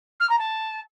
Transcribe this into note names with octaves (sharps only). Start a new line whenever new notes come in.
F6
A#5
A5